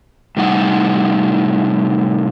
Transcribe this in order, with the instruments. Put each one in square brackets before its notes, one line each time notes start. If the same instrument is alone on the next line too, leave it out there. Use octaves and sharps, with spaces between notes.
[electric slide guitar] A2 C3 G3 D#4 F#5